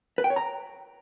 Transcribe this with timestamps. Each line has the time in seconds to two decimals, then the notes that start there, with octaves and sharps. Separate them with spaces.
0.18 B4
0.24 G5
0.30 C#5
0.36 A#5